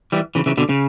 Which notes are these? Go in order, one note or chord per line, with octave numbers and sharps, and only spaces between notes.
E3 G3
C#3 E3
C#3 E3
B2 D3
C#3